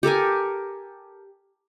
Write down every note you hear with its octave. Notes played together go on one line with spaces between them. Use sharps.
G4 A4 A#4 G#5